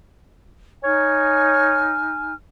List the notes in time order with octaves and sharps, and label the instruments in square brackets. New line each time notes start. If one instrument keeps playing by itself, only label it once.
[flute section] D#4 G#5 F6 [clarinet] C#5